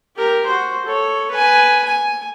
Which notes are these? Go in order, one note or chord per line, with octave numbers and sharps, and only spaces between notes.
G4 A#4
F#4 C5
A4 C#5
B4 G#5
G#5